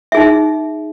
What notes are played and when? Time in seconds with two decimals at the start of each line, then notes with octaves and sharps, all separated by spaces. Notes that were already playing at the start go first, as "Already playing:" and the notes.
0.12 E5
0.15 G#4
0.17 D#4